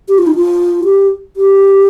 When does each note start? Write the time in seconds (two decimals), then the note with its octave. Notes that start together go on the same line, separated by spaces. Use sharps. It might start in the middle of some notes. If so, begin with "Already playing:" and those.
0.09 G4
0.18 F4
0.27 D#4
0.36 F4
0.84 G4
1.36 G4